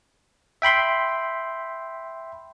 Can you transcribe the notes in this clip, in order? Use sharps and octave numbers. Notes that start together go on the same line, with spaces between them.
E5 G5 B5 C6